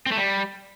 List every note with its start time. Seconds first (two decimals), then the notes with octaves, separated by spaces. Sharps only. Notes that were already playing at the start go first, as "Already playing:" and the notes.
0.06 C4
0.12 A3
0.17 G3